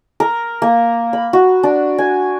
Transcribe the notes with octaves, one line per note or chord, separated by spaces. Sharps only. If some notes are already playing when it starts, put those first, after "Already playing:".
A#4
A#3
B5
F#4
D4
G#5